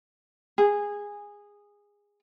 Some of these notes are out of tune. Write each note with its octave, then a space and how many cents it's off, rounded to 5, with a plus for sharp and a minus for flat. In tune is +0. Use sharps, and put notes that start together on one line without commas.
G#4 -15